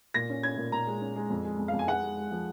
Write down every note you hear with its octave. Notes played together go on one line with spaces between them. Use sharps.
A#2 A#6
C#4
C#4 G#6
A#2
A#2 A#5
G#3
C#4
G#3
F2
G#3
F2
F5
F2
G#5
G#3 F#5
G#3
G#3
F3